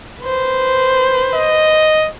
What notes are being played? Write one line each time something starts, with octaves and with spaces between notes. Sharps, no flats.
B4 C5
D#5